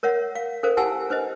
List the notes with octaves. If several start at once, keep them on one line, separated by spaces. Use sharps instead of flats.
A#4 C#5 E5 F#5
F5
C#4 A4 A#4 C5 F5
E4 G4 F#5 G#5 A5 E6
D4 B4 C5 D#5